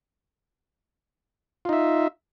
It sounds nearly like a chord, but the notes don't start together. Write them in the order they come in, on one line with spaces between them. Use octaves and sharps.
F4 D#4 E5